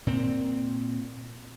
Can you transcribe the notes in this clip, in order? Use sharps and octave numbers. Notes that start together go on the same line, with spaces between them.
A#2 C4